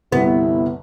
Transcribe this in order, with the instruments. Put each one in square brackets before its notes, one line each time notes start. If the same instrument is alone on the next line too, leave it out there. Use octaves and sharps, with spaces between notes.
[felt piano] G1 C2 G3 [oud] B3 [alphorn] E4